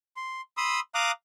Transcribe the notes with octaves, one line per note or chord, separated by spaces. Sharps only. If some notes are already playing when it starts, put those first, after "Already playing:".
C6
B5 C6 D#6 E6
F5 A#5 D6 D#6 F#6